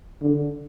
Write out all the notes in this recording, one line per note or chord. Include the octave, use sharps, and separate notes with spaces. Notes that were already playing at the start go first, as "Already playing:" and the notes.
D3